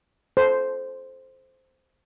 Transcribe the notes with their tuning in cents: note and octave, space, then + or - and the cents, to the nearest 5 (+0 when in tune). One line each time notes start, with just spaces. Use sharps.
A4 -25 C5 +0